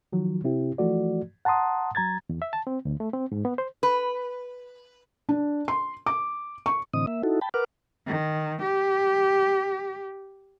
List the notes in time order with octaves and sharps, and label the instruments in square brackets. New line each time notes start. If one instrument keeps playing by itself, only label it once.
[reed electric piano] D#3 F3 F#3
C3 C4 E4 G4
E3 F3 A3 F#4 D5
F#5 A5 A#5 C6 D#6
F#3 A#5 G#6 A6
E2
E5
A5
C4
D2
A3
C4
G#2
B3
C5
[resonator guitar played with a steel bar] B4
[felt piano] D4
C6
D6
C#6
[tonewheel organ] A2 D3 E3 C4 D#5 D#6
A#3 E5
D#4 E4 F#4 A4
G5 A5 B5
A#4 B4 F#5 D6 F6
[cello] D#3
G4